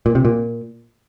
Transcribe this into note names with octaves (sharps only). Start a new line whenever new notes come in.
A#2
C3
A#2